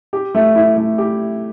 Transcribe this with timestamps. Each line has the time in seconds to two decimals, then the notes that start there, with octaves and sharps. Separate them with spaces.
0.13 G4
0.35 A3
0.55 E4
0.77 A3
0.98 G4